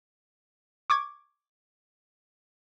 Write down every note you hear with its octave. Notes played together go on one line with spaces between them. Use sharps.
C#6 D6 G#6